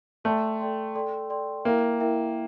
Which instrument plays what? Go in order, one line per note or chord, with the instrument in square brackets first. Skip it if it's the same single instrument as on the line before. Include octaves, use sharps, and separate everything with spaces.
[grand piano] A3 [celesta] A4 D5 G5 C6
[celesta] A4 D5 G5 C6
A4 D5 G5 C6
A4 D5 G5 C6
[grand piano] A#3 [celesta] E4 A#4 E5 G5
[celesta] E4 A#4 E5 G5